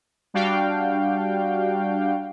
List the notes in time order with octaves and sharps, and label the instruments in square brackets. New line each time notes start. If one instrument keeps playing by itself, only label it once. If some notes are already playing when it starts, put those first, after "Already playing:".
[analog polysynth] G3 D4 F#4 F5 G5